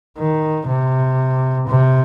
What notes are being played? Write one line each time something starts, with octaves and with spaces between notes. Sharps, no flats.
D#3
C3
C3